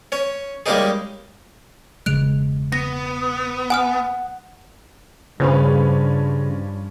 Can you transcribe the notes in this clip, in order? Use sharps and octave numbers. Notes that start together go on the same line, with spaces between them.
C#4 C#5
G3 G#3 A#3 C#4 D#4 G#4
E1 C#3 G#3 F#6 D7 F7
B3 A#6
F#5 G#5 D#6 F6
G2 C#3 F3 C#4 B4